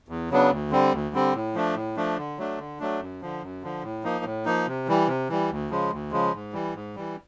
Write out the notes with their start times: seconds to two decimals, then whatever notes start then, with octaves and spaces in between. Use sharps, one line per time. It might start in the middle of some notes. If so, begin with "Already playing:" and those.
0.09 E2
0.30 C#3 F#3 B3 D4
0.51 D2
0.71 D3 G3 C4
0.92 D2
1.13 D3 G3 C4
1.34 A2
1.55 F3 A3 D4
1.75 A2
1.96 F3 A3 D4
2.18 D3
2.38 F#3 A3 D4
2.58 D3
2.80 F#3 A3 D4
3.00 F#2
3.22 D3 F3
3.42 F#2
3.63 D3 F3
3.83 A2
4.04 F3 A#3 D#4
4.25 A2
4.45 F3 A#3 D#4
4.67 C3
4.88 E3 G3
5.07 C3
5.29 E3 G3
5.50 D2
5.70 C#3 F3 G#3
5.92 D2
6.11 C#3 F3 G#3
6.33 G#2
6.53 E3 G3
6.75 G#2
6.95 E3 G3